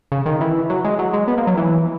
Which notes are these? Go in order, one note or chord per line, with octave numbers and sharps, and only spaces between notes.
C#3
D#3
E3
F#3
G#3
F#3
G#3
B3
A#3
F#3
E3